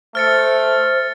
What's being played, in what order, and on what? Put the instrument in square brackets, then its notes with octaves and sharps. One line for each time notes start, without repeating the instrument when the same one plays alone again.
[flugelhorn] A3 [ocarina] C5 [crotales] F6 A6 C#7